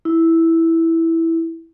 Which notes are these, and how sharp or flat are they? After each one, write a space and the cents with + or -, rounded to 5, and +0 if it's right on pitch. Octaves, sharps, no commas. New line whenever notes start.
E4 -5